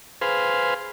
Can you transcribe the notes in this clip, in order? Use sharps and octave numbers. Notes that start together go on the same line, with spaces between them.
G#4 B4 C5 F5